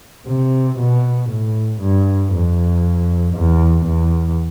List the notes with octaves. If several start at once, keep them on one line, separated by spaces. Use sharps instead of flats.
C3
B2
A2
G2
F2
E2
E2